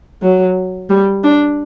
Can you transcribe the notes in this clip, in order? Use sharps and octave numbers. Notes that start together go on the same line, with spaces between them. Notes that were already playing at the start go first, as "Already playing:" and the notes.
F#3
G3
D4